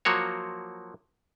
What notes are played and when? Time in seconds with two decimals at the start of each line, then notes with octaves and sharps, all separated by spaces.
0.05 F3 F#3 A#3 F#4 C#5